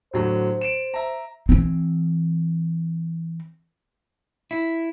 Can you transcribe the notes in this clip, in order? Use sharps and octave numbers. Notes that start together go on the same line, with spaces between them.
A2 D3 F#3 C5
D7 E7
E5 A#5
E3 C4
E4